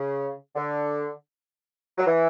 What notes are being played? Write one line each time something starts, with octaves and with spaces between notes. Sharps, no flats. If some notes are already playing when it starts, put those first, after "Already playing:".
Already playing: C#3
D3
F#3
E3